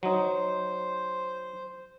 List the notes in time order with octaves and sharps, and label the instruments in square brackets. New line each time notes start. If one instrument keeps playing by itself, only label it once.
[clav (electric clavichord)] F#3 D#4 [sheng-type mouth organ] C5